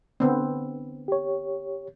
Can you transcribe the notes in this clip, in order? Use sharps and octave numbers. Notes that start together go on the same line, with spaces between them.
D3 B3 C4
G4 C#5